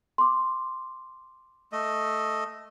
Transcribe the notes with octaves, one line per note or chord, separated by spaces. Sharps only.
C6 D6
A3 D#5